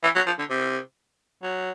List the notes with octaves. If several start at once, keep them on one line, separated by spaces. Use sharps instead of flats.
E3
F#3
F3
D3
C3
F#3